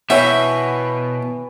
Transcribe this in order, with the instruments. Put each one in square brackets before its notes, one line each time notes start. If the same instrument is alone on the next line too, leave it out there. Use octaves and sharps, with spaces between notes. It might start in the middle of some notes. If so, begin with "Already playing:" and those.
[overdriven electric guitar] B2 [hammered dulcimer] E3 [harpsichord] C#5 F#5 G5 [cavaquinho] E5